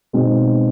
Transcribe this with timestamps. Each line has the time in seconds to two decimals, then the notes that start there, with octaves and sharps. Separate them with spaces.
0.13 B2 G#3 C4 D#4